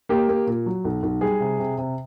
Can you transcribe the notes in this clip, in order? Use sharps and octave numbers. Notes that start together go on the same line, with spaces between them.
A#3 G4
A#3
A#2
F#3
B1
B1
G3 G#4
C3
C3
C3